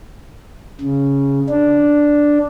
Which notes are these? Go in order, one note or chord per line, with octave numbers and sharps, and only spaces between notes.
C#3
D4